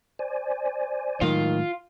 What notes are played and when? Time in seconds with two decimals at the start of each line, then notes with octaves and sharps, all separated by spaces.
0.19 C5 D5 G#5
1.21 A2 D#3 F#3 G#3 F4